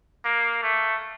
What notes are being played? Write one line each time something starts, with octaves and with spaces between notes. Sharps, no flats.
A#3
A3